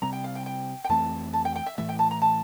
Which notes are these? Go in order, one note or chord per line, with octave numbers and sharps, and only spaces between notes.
C3 G3 C4 A#5
G5
F5
G5
G5
G5
F2 E3 A3 C4 A5
A5
G5
G5
E5
A2 E3 A3 E5
G5
A5
A#5
A5